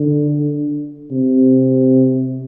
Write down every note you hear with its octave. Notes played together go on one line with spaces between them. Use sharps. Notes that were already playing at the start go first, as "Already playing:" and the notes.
Already playing: D3
C3